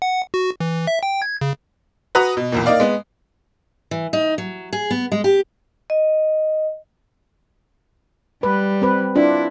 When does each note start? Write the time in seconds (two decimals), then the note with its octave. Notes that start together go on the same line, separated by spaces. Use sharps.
0.02 F#5
0.34 F#4
0.60 E3
0.87 E5
1.03 G5
1.22 G#6
1.41 C#3
2.15 F#4 B4 F#5 A#5 D#6
2.37 B2
2.52 B1 E2 A#2
2.66 A#3 D#4 D5 F5
2.80 G#3 B3
3.91 E3
4.13 D#4
4.38 F#3
4.73 G#4
4.91 B3
5.12 G#3
5.24 G4
5.90 D#5
8.43 G3 B4
8.82 C4 B4
9.16 D4 E4 F4